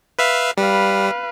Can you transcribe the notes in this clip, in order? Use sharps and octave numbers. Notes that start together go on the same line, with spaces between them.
B4 E5 F5
G3 B4 F5